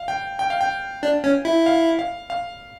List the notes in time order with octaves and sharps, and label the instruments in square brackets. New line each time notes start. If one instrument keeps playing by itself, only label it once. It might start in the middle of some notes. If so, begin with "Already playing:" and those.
Already playing: [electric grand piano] F5
G5
G5
F5
G5
[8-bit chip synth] D4
C#4
E4
[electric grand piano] F5
F5
F5